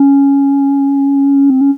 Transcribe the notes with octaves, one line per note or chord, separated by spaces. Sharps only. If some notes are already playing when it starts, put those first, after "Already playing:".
Already playing: C#4
C4
C#4